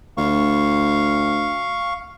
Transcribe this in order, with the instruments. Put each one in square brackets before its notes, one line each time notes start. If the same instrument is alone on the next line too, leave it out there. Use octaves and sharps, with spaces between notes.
[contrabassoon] D2 [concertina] F5 C#6